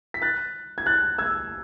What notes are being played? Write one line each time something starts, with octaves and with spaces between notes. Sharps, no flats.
B6
F#6 A6
G#6
F#6 A6
E6 G#6